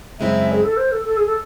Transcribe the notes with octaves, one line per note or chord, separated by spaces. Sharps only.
F#2 C#3 G#3 C4 E4 E5
G#4
A4
C5
A4
A4
G#4
A4